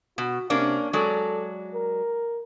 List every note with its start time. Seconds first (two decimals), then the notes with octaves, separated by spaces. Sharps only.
0.18 B2 F#4
0.50 C3 A#3 C#4 D4
0.93 F#3 G#3 A4 D5
1.74 A#4